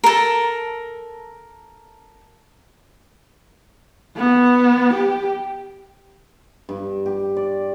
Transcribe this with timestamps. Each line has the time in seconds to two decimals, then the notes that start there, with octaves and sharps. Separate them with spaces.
0.04 A4 A#4
4.16 B3
4.94 G4
6.69 G2
7.06 G4
7.36 D5